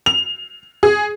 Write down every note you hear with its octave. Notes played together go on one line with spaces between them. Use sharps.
F7
G#4